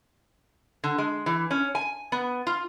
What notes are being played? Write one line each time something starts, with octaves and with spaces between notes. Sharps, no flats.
D3
G#3
E3
C#4
G#5
B3
F4